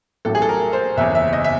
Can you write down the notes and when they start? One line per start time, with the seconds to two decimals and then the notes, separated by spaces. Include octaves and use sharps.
0.25 A1 A2 F#3 A#3 A4
0.35 G#4
0.42 A4
0.49 A#4
0.73 C5
0.97 F#1 E2 C#3 E5
1.15 E5
1.33 D#5
1.44 E5